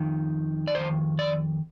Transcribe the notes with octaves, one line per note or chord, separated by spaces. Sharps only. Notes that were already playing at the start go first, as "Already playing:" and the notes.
Already playing: F2 D#3
D5
F2 D#3 C5
D5